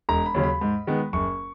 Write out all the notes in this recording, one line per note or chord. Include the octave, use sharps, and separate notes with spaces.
E1 A#5
B5
D#2 C#3 F#3
B5
G#2
D#3 G#3 B3
F#1 C#6